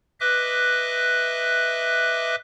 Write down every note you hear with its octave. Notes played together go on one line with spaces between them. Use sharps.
B4 D#5 E5 D6 F#6